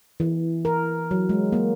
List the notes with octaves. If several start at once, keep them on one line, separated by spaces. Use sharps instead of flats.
E3
A#4
F#3
G#3
A#3